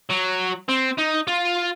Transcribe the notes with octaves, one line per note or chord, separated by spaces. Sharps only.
F#3
C4
D#4
F4